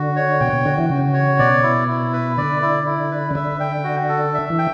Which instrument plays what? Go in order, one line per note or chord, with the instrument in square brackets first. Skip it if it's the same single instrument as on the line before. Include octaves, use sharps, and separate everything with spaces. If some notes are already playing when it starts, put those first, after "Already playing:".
Already playing: [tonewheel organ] D3 [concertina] F#4
[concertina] C#5
[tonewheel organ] B2 [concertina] G5
[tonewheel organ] B2
[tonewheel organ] D3 [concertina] F#4
[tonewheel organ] E3
[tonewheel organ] C#3 [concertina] F#4
[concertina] C#5
[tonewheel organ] B2 [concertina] D5
[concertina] E4
E4
B4
[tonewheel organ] D3 [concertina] D5
[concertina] E4
E4
B4
[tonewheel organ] C#3
[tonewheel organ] D3 [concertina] E5
[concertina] G5
F#4
A4
E5
[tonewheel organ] E3
[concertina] G5